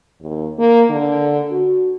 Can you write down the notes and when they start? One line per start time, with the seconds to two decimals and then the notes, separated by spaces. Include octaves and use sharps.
0.21 D#2
0.59 A#3
0.90 D3
1.51 F#4